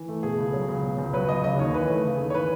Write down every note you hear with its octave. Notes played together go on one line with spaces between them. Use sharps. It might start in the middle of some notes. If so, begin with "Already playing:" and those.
Already playing: E3
A3
B2 G#4
C#2
F#3
C#2
B2
C#2
F#3 B4
C#2 D#5
C#3 D#5
D#2 C#5
E3 B4
A3
C#3
D#2
C#5
E3 B4